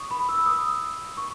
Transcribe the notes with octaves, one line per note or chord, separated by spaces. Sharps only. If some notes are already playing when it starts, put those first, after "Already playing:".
Already playing: C#6 D#6
B5
E6
D#6
C#6